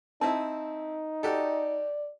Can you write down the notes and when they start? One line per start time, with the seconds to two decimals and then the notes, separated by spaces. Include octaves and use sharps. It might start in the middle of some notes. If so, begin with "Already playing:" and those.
0.21 C4 D#4 E4 A5
1.23 F#4 G4 A4 D5